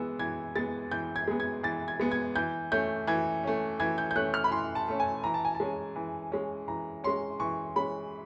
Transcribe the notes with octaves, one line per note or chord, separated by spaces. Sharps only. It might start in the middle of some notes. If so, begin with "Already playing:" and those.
Already playing: E3 G#3 B3 E6
E3 G#6
G#3 B3 A6
E3 G6
G#6
G#3 B3
G#6
E3 A6
G#6
G#3 B3
G#6
E3 G6
A3 C#4 G6
E3 G#6
A3 C#4
E3 G#6
G6
G6
A3 C#4 F#6
F6
B5
E3 C6
A5
A3 C#4
G#5
E3 A#5
A5
G#5
A5
G#3 C#4
E3
G#3 C#4
E3 A#5
G#3 C#4 C6
E3 C#6
G#3 C#4 B5